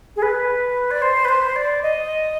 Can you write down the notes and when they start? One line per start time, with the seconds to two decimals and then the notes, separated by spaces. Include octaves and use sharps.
0.16 G#4
0.22 B4
0.90 D5
1.02 C5
1.24 B4
1.28 C5
1.55 D5
1.82 D#5